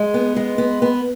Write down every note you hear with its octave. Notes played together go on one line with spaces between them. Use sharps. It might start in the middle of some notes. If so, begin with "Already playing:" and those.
Already playing: G#3
B3
G#3
B3
B3